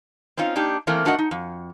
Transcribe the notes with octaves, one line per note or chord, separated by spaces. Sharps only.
C4 C#4 D#4 F4
A#3 D4 D#4 G4
E3 A3 A#3 C4 A#4
A3 D4 F#4 A#4 D#5 F#5
D#4
F2